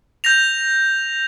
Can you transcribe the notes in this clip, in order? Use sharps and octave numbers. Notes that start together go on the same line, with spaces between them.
G6 A#6 F7